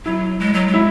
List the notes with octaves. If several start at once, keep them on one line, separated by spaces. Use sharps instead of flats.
F#3 E4
G#3
F#3
G#3
E4